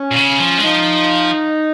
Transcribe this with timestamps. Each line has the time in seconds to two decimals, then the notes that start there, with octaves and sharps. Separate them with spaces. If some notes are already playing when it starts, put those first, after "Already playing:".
Already playing: C#4
0.11 A#2
0.16 C#3
0.40 F3
0.58 G#3
0.64 F3 D#4